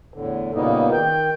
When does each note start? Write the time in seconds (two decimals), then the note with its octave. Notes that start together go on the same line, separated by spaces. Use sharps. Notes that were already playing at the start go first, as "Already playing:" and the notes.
0.14 E2 A2 D3
0.54 A#2 C#3 G3 A#3 B3 D#4
0.93 D#3 G5 G6